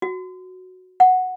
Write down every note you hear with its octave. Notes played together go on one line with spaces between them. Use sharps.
F#4
F#5